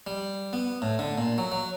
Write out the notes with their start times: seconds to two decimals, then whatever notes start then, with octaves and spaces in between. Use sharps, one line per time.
0.07 G3
0.53 B3
0.82 A2
0.99 D3
1.18 A#2
1.38 F#3
1.52 F#3